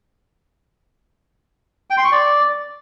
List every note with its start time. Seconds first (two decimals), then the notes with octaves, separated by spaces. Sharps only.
1.90 G5
1.97 C6
2.05 C#6
2.12 D5